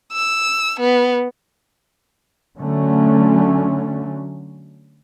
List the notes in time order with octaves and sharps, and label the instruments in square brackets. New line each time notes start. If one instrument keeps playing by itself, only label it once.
[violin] E6
B3
[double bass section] D3 F#3 A3 C#4